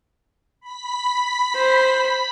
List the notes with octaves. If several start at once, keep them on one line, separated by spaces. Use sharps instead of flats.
B5 B6
C5